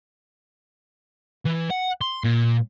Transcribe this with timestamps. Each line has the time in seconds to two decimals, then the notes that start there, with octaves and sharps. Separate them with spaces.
1.46 E3
1.71 F#5
2.01 C6
2.24 A#2